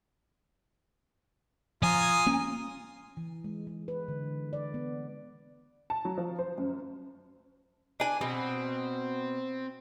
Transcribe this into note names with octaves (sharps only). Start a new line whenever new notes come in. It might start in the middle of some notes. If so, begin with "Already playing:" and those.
F3 F4 G#5 A#5 D#6
A#3 C#4
E3
G#3
G#3
B4
D3
D5
B3
A5
F#3
F3
C5
F#2
D4 G#5
B2 C4